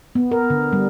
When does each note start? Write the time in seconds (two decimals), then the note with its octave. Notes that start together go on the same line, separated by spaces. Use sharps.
0.15 B3
0.31 A#4
0.50 D3
0.73 G3